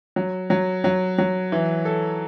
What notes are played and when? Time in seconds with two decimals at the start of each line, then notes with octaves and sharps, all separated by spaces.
0.16 F#3
0.50 F#3
0.84 F#3
1.18 F#3
1.52 E3
1.85 A4